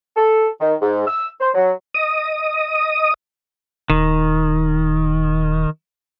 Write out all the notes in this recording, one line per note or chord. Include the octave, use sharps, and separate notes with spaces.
A4
D#3
G#2
E6
C5
F#3
D#5 D#6
D#1 D#3